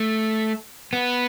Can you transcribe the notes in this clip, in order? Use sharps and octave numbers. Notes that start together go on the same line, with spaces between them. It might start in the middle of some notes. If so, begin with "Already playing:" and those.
Already playing: A3
B3